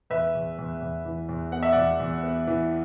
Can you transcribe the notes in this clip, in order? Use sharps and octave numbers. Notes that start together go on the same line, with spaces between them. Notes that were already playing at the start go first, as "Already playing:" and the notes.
E2 B4 E5
E2
E2
E2
E3
E2
B3 F#5
E5
E2 D5 F#5
E2
B3
E3